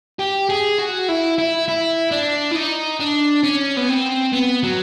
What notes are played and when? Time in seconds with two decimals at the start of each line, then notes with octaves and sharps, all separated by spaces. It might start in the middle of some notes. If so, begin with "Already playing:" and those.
0.19 G4
0.50 G#4
0.79 F#4
1.09 E4
1.38 E4
1.68 E4
2.11 D4
2.52 E4
2.56 D#4
3.00 D4
3.44 C#4
3.77 B3
3.89 C4
4.32 B3
4.63 F#3